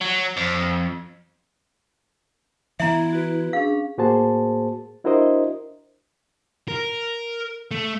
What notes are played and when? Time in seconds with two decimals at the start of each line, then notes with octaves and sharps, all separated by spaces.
0.01 F#3
0.37 F2
2.80 E3 B3 E4 E5 A#5
3.13 F#4 B4
3.53 C#4 D4 G#4 F5
3.98 A2 A#3 F#4 G#4 C5 A5
5.04 D4 E4 F#4 A#4 C5 D#5
6.68 A#4
7.71 A3